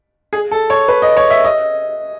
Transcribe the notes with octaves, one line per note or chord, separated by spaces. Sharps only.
G#4
A4
C#5
B4
D#5
C#5
E5
D#5